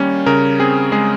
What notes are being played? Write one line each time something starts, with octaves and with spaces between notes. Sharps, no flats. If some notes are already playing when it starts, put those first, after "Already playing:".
Already playing: D#3 G3 A#3 C#4
C#3 A#4
C4 G#4
G#3 G#4